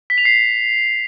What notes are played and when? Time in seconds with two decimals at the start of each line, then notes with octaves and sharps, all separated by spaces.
0.10 B6
0.18 F7
0.25 C7